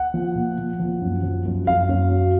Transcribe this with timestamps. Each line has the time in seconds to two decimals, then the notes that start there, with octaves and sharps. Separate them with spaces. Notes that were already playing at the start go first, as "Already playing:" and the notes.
Already playing: F#5
0.14 F3
0.35 A#2
0.58 A#2
0.79 F3
1.01 F#2
1.23 F3
1.45 F#2
1.67 F#2 F5
1.89 F#2
2.11 F#3